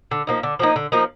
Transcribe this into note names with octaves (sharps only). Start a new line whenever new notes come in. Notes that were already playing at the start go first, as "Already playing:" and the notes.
D3
F3 A#3 D#4
D3
F3 A#3 D#4
D3
F3 A#3 D#4